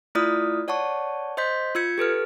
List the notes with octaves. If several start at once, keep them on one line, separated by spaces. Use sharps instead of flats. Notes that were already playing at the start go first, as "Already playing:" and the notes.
A3 E4 F4 D5 D#6 F6
C#5 D5 F#5 A5 C#6
C5 D#5 C6 G6 B6
F4 E6 G#6 C#7
G4 A4 B4 F6